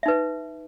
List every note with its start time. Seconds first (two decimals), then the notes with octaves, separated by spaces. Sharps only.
0.03 E5
0.06 D#4
0.08 B4